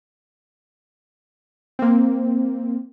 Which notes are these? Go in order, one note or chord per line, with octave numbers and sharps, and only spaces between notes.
A#3 C4